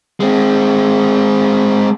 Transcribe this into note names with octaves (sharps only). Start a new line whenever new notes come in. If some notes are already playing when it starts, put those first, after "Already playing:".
G#3 C4